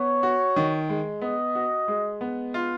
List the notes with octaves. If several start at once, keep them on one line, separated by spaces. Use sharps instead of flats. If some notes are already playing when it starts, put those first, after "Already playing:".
Already playing: B3 C#5
F#4
D#3
G#3
B3 D#5
F#4
G#3
B3
F4